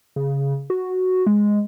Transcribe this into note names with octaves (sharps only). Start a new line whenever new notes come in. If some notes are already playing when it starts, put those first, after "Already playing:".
C#3
F#4
G#3